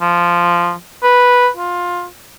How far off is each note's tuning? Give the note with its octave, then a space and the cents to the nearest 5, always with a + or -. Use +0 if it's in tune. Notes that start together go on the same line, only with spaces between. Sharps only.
F3 -10
B4 -5
F4 +15